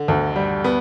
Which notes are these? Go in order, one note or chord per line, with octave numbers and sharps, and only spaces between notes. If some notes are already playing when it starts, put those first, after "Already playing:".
Already playing: D3
D2
G3
B3